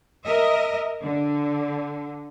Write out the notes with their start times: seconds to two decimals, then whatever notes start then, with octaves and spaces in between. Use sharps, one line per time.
0.25 A#4 D#5 E5
1.00 D3